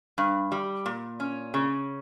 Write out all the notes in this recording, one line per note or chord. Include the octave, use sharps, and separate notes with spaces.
G2
G3
A#2
C#4
C#3